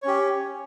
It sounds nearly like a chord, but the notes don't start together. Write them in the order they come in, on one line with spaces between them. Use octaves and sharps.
C#5 C#4 G4